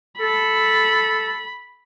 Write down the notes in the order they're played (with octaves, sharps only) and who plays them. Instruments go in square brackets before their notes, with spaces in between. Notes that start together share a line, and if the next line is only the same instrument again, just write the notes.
[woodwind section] A4 [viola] B5